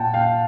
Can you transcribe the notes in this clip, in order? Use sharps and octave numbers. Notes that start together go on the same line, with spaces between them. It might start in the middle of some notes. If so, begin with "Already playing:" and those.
Already playing: A#2 F#5 G5 A5
F5 G5